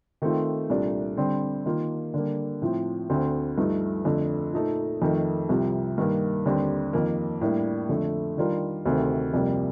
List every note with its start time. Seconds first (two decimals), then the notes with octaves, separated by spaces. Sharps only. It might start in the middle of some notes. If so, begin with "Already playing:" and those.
0.22 D#3 A3 C4 F4
0.70 C2 A#2 A3 D4
1.17 D3 G3 C4
1.66 D#3 A#3 F4
2.14 D3 G3 A#3
2.62 A2 F3 C4
3.09 D2 D3 A3 C4
3.58 G2 F3 A3 D#4
4.05 F2 D3 A3
4.53 A#2 A3 D#4 A4
5.02 F2 D#3 A3
5.49 C2 C3 F3
5.98 G2 D#3 A#3
6.45 D#2 D3 G3 C4 G4
6.93 F2 D#3 A#3
7.41 A2 G3 A#3 D4
7.89 F2 D3 A3
8.37 D#3 G3 D4 F4 A#4
8.85 D2 C3 D#3 A3 C4
9.34 F2 C3 G3 A#3